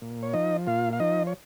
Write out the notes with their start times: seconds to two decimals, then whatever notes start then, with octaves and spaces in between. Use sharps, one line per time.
0.02 A#2
0.23 C#5
0.34 F3 D#4 D#5
0.67 A#2 F4 F5
0.93 F5
1.00 F3 D#4 D#5
1.27 C#5